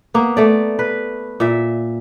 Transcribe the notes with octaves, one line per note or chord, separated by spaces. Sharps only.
A#3 B3
A3 D5
B4
A#2 E5